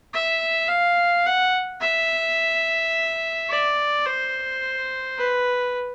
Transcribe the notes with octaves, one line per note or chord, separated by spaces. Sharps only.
E5
F5
F#5
E5
D5
C5
B4